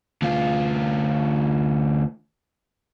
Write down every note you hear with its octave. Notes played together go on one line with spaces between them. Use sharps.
D2 F4